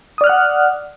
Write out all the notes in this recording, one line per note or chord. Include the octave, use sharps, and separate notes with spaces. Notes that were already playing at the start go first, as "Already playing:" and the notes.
D5 F#5 D#6 F6 F#6